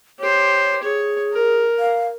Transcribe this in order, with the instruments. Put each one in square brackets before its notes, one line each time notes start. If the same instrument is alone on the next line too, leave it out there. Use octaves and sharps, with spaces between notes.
[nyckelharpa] G4 C5 [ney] C#5
[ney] G#4 [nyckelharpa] C#5
[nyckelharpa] A#4
[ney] F5